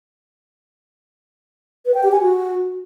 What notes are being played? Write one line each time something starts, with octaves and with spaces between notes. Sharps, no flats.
B4
G5
G4
G#5
F#4